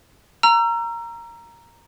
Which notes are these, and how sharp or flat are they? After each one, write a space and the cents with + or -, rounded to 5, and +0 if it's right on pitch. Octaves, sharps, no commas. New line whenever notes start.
A#5 +0 E6 +40